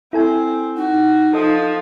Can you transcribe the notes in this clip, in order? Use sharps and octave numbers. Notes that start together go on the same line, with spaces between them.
C4 E4 A4 G#5
D#4 F#4
F3 A4 D#5 D#6